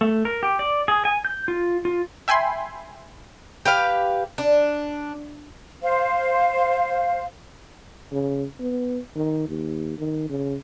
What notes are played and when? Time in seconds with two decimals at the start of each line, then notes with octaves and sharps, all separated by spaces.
0.01 A3
0.25 A#4
0.43 G4
0.59 D5
0.88 G#4
1.05 G#5
1.25 G6
1.48 F4
1.85 F4
2.28 E5 G5 G#5 B5 C6
3.65 G4 B4 F5
4.38 D4
5.82 C5 F5
8.12 C#3
8.59 B3
9.16 D#3
9.49 D#2
9.98 D#3
10.30 C#3